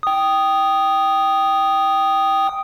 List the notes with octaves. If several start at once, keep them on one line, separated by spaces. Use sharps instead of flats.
G5 D#6